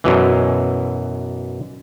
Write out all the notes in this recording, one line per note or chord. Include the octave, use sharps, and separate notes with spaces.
F#2 B2 E3